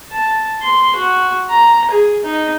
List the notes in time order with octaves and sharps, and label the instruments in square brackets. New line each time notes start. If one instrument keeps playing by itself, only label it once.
[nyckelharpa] A5
C6
F#4
A#5
G#4
D#4